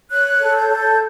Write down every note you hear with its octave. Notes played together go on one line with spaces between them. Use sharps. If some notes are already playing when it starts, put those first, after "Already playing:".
C#5 F#6
A4
G6
A4